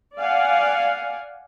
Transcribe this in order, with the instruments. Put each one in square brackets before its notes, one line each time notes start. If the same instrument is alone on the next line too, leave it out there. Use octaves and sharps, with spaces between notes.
[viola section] D5 F5 F#5 G#5